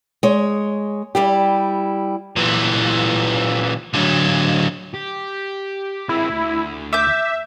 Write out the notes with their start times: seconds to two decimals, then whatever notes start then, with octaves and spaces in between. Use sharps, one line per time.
0.23 G#3 C#5
1.15 G3 E4 G4
2.36 A#2 E3
3.94 D3 F#3
4.94 G4
6.09 G#3 C4 E4
6.30 D2
6.93 E5 D6 G6